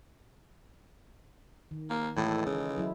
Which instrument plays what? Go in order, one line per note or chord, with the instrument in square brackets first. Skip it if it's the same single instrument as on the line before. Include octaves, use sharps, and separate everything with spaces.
[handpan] D#3
[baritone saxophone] A#3
[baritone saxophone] A2 [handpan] E3 G#3 A4
[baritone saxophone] C#3 [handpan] G#3
[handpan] F#3 E4